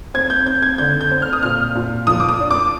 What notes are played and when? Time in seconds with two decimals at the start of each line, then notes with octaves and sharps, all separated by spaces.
0.14 C4 G#6
0.30 G6
0.46 C4 G6
0.62 G#6
0.78 D3 G6
1.01 G6
1.11 C4
1.22 F6
1.33 D#6
1.43 A#2 F6
1.75 A#2
2.07 F3 D#6
2.20 D6
2.29 D#6
2.40 D4
2.51 D6